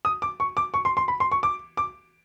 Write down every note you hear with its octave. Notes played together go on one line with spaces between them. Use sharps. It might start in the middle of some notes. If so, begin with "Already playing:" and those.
D#6
D6
C#6
D6
C#6
C6
C6
B5
C6
C#6
D6
D6